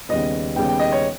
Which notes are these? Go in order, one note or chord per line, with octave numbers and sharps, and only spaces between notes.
D#2 C#3 G3 B3 D#5
D#2 C#3 G3 B3 G5
G5
D#5
C#5